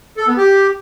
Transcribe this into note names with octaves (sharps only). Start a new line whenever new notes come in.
A4
B3
G4